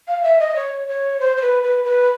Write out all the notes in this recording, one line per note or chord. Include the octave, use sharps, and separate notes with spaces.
F5
E5
D#5
C#5
C#5
C5
C5
B4
B4
B4